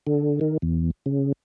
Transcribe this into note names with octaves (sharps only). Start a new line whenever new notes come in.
D3
D#3
E2
C#3